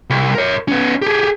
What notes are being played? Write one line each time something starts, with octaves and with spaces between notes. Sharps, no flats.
C2
A#4 C#5
B3 C#4
G4 G#4